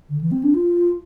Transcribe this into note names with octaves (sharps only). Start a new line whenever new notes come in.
D3
E3
C4
D4
F4